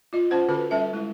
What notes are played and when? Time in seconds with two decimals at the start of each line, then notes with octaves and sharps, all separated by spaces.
0.13 F4 D#5
0.31 C#4 F4 C5 F#5
0.48 D3 C#4 F#4 A4 B4
0.71 G3 C#4 A4 E5
0.93 G#3 E4